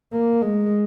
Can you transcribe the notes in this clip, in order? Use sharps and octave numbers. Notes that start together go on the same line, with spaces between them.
A#3
G#3